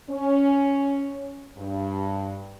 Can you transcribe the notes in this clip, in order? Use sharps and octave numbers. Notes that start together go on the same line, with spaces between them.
C#4
G2